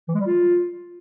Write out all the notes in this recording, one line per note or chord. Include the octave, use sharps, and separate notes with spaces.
E3
G#3
G3
F4